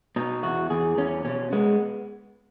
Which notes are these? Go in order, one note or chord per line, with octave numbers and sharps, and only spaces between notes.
B2 D#4
E2 F#4
E2 G#4
E2 C#4
B2 C#4
G#3 B3